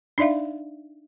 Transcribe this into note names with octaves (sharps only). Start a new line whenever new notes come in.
D4 D#4 D5 E5 F5